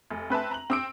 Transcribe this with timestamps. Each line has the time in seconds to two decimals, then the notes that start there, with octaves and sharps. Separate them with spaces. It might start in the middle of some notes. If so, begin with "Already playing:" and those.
0.11 F1
0.30 C4 B4 E5 A5
0.51 A#5 F#7
0.70 C4 E6 D7